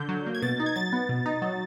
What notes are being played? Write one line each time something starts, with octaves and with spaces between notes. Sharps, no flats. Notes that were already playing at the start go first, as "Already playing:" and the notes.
Already playing: D3 G6
F#3
A#3
G#6
B2 A6
D#4
G#6
F#3 A6
B3
B2
D#4
F#3